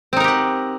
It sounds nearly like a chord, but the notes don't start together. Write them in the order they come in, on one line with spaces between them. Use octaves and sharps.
C4 D#4 A#4 G4 F#5